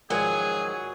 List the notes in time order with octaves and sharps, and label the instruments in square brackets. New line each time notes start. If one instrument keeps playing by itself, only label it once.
[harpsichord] G#2 D#3 F3 [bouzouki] F#3 [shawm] G#4 [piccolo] G#5